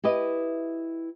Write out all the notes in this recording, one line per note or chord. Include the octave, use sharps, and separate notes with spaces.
E4 G4 B4 D#5